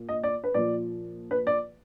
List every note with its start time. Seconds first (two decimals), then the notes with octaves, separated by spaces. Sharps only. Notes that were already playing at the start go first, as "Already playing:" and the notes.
Already playing: A#2
0.09 D#5
0.23 D5
0.44 B4
0.54 A#2 F3 D5
1.31 B4
1.47 D5